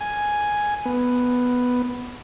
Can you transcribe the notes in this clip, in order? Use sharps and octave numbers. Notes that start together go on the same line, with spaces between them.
G#5
B3